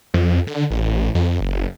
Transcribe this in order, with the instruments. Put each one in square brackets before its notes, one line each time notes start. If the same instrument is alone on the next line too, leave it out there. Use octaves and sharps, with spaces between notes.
[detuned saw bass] F2
D3
A1
F2
F#1